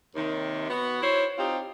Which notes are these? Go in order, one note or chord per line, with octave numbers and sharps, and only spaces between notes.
D#2 C3 D#3
B3 F#4
E4 C5 C#5
C4 D#4 F4 G4